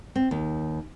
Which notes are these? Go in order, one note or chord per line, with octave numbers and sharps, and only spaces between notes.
C4
D#2